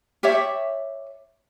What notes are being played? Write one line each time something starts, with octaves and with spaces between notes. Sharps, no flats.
G4 C#5 D5 E5